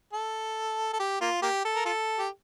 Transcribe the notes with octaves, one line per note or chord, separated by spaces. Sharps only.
A4
A4
G4
A#3 F4
A#3 G4
A4
A#4
F4 A4
G4